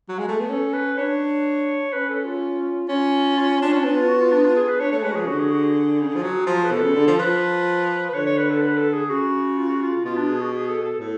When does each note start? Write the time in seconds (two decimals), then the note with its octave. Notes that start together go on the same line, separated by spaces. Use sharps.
0.09 F#3
0.19 G#3
0.29 A3
0.40 B3
0.50 C#4 A4
0.73 B4
0.98 D4 C#5
1.93 C#4 B4
2.10 A4
2.25 F4
2.89 C#4 F4
3.37 F4
3.48 F4
3.60 D4 F4
3.72 C#4 F4
3.84 B3 D4
3.96 F4
4.08 F#4
4.20 F4
4.32 D4
4.44 F4
4.56 G#4
4.68 B4
4.79 D4 C#5
4.92 A3 C#5
5.03 G#3 B4
5.12 F#4
5.15 F3 G#4
5.24 C#3
5.27 D3 F#4
5.40 G#4
5.52 F#4
5.63 G#4
6.01 C#3
6.08 D3
6.15 F3
6.23 F#3
6.47 F3
6.63 B4
6.71 B2 A4
6.83 C#3
6.94 D3
7.07 F3
7.19 F3 B4
8.09 B4
8.14 D3 C#5
8.26 C#5
8.38 B4
8.50 A4
8.61 B4
8.77 A4
8.94 G#4
9.10 C#3 F#4
9.57 F4
9.70 F#4
9.82 F4
10.05 B2 F4
10.17 D4
10.29 G#4
10.41 F#4
10.53 G#4
10.69 A4
10.85 A4
11.00 A2 A4